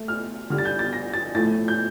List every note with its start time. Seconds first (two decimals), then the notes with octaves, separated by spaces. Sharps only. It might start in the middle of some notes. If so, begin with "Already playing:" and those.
Already playing: A3
0.08 F6
0.50 D3 G3 F6
0.58 A6
0.65 G6
0.79 A6
0.93 A#6
1.14 A6
1.35 A2 F3 A3 A6
1.68 G6